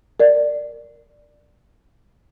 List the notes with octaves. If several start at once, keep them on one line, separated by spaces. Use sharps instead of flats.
A#4 D5